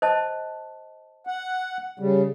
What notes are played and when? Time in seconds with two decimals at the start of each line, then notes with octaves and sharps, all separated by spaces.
0.02 C5 D#5 A5
1.27 F#5
2.00 C#3 G3